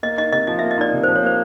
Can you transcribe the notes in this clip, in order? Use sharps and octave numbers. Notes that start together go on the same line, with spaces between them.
A#3 D#5
D#4 D#5
C3 D#5
F3 D#5
A#3 E5
D#5
D#4 D5
C3
F3 C5
C#5
A#3 C5